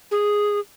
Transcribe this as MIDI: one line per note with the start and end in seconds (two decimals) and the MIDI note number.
0.11 0.60 68